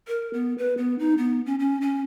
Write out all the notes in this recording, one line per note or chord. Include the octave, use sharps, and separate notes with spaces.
A#4
B3
B4
B3
D#4
B3
C#4
C#4
C#4